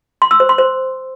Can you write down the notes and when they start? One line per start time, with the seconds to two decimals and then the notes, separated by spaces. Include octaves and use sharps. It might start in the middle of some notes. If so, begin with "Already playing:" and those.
0.22 C6
0.31 E6
0.40 C5
0.49 C6
0.58 C5